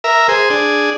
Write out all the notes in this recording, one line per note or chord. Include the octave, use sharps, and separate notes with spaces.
A#4 E5
G#4 C5
D4 G#4